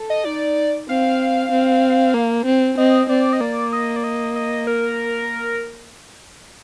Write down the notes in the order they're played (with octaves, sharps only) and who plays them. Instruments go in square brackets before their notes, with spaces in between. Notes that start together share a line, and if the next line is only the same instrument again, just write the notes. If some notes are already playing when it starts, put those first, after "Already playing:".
Already playing: [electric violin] A4
[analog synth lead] D#5
[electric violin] D#4 [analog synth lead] D5
[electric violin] C4 [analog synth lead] F5
[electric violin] C4
A#3
C4
[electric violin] C4 [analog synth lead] D#5
[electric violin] C4 [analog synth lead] D5
[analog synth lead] D#5
[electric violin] A#3 [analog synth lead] D5
[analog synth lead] D#5
D5
D#5
D#5
A#4